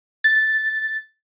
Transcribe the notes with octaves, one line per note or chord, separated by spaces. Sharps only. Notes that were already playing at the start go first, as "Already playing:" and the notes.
A6